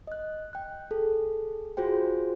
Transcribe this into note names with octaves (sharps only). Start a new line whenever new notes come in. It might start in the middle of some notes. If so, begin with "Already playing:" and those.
D#5 F#6
G5 F#6
G#4 A4
F4 F#4 G#4 C5 G5